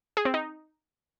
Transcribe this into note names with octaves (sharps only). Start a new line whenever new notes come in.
G#4
C4
D#4